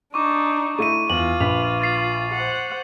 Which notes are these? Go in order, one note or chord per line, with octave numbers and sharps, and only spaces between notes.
D4 D#4 C#6 D6
A3 E4 C#6 D#7
E2 F4 F#7
A#1 B4 B6 F7
A6 C7 F7
C5 F#5